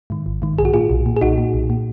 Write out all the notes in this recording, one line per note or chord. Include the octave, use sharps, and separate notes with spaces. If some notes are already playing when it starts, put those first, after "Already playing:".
G#2 D#3
G#1
G#2 D#3
B1 G#4
F#4
A#2 F4 G#4
B1
A#2
G#4
B1 D#4 F#4
A#2
B1
A#2